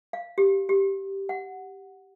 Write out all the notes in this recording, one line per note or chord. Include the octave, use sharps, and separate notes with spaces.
F5
G4
G4
F#5